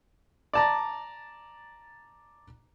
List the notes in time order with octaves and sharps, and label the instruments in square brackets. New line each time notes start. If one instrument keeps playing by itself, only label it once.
[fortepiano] D5 A5 A#5